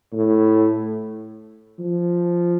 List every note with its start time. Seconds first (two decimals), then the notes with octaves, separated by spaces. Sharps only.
0.13 A2
1.79 F3